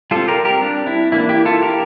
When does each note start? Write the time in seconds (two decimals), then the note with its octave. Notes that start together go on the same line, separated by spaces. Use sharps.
0.11 G3 C4 F4 A4
0.28 G4 A#4
0.45 G4 A#4
0.62 D4
0.87 E4
1.12 E3 A#3 D4 E4
1.29 E4 G4
1.45 F4 A4
1.62 G4 A#4